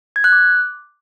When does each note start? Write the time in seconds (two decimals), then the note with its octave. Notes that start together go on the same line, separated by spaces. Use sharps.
0.16 G#6
0.24 F#6
0.32 D6